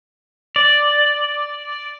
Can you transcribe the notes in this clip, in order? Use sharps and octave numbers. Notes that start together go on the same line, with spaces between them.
D5